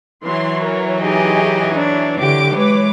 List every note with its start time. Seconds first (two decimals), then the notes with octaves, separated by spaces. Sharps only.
0.24 E3 F#3 C6
0.62 A#4 C#5
1.02 D#4 G4 G#4 D#5
1.75 D4
2.20 D3 G4 D6 D7
2.55 G#3 B4 C#5 D6